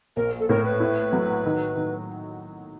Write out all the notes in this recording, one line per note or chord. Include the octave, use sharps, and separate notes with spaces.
A#1 A#4
A4
A2 A#4
B4
E4
F#3
D#3
D#3